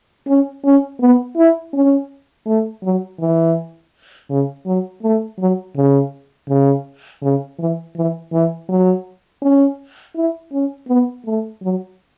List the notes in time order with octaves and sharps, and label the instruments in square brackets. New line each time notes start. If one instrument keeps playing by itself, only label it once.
[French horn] C#4
C#4
B3
E4
C#4
A3
F#3
E3
C#3
F#3
A3
F#3
C#3
C#3
C#3
E3
E3
E3
F#3
C#4
E4
C#4
B3
A3
F#3